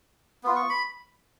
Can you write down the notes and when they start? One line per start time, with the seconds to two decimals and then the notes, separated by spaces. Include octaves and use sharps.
0.43 B3 F4
0.56 C#6
0.69 B5